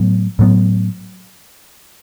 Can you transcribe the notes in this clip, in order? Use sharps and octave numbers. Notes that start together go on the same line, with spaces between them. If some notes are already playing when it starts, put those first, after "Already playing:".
Already playing: A2 F#3 B3
A2 F#3 B3